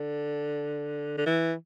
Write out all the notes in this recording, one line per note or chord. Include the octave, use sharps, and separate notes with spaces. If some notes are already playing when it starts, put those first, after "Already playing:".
Already playing: D3
D3
E3